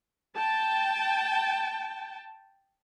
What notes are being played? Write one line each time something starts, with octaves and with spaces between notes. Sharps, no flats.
G5 A5